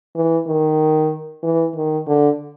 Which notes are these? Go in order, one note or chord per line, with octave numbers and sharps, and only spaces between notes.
E3
D#3
E3
D#3
D3